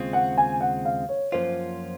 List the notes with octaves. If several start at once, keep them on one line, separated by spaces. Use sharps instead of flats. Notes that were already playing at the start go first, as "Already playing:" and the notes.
Already playing: D#2 C#3 G#3 C4 F4
F#5
G#5
F#5
F5
C#5
F#2 F3 A#3 C#4 F4 C5